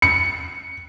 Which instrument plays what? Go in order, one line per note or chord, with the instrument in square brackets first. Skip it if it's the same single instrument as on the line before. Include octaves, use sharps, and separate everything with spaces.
[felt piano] C#7